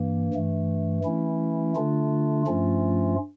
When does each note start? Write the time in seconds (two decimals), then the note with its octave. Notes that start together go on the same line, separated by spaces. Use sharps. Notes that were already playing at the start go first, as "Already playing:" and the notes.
Already playing: G2 E3 A#3
0.33 G2 E3 A3
1.04 E3 A3 C#4 E4
1.76 D3 A3 D4 F4
2.46 G2 F3 A3 C#4 F4